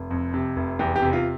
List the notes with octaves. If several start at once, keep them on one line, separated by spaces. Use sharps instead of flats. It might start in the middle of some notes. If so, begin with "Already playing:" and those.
Already playing: F1
F2
C3
F1
E2 G4
G4
C3
F4